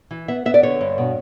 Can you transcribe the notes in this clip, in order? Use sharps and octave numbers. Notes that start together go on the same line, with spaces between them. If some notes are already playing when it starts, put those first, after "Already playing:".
E3
B3 E5
B3 E5
D5
D3 C#5
G2
B2